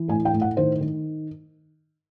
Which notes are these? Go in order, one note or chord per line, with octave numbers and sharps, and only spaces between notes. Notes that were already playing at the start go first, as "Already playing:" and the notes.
Already playing: E3
A2 G#5
G5
A2
F#5
D#3 C5
D#3